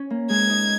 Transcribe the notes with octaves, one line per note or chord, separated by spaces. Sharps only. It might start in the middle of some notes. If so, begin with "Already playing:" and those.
Already playing: C#4
A#3
G#3 G#6
D#4